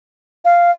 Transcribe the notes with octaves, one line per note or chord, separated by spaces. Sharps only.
F5